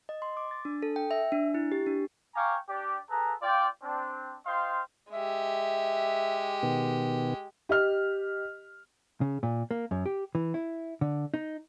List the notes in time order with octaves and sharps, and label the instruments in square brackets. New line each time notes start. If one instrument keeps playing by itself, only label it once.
[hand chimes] D#5
C6
D6
A6
D4
A4
G5
E5
D4
E4
G4
D4
[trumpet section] F5 G5 G#5 A#5 C#6 D6
D4 G4 D5
G#4 A4 B4 A#5
F4 D5 G5
C4 D4
F4 C5 D#5 F5 G5 C6
[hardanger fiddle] G#3 G4 [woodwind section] E5
[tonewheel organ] B2 D#3 B3
[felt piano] G4 D#5 F6
[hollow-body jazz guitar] C#3
A#2
A#3
F#2
G4
E3
E4
D3
D#4